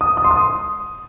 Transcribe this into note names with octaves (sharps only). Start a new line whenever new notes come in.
D#6
D#6
C6
D#6